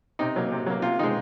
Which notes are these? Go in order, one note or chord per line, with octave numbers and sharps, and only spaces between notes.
C3 D#4
F#3 A#3
C3
F#3 A#3
C3 F4
D#3 G#3 D#4